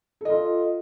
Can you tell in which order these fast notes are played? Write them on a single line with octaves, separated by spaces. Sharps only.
A4 D#5 F4